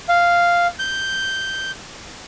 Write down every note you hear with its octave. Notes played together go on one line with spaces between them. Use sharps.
F5
G6